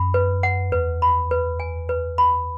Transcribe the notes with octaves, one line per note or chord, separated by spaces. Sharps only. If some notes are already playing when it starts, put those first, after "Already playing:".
Already playing: F#2 B5
B4
F#5
E2 B4
B5
B4
G#5
B4
B5